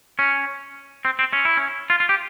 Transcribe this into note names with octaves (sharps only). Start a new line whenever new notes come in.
C#4
C4
C4
C#4
E4
C#4
F4
F4
G4